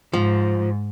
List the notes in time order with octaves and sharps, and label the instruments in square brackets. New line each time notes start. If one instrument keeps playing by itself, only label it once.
[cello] G#2 [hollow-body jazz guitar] F3